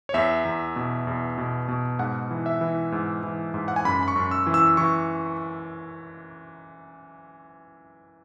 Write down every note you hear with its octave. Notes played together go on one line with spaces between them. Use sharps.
C#5
E2 E5
E2
B2
E2
B2
B2
G#2 F#5
E3
E5
E3
G#2
E3
G#2
F#5
G#5
F#2 B5
B5
C#6
F#2
E6
E3
E6
E3 C#6